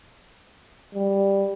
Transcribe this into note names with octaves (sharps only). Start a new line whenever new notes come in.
G3